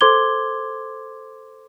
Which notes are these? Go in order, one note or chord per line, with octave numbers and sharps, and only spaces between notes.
A4 C5 C6 D6 G#6 G7